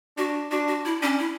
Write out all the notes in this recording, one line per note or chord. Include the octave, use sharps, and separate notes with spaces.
D4 F#4
D4 F#4
F#4
E4
C#4 D4
E4